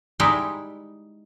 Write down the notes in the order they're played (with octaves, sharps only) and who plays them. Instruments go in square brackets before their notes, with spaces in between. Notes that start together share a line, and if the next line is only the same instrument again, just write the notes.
[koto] G3 G#3 D#4 E4 G4